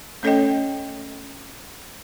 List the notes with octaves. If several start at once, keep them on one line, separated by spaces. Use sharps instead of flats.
A3 C#4 A4 C#5 D#5 G5